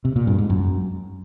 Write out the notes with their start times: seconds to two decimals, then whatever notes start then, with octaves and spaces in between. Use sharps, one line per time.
0.05 C3
0.16 A#2
0.27 G2
0.38 G#2
0.50 F#2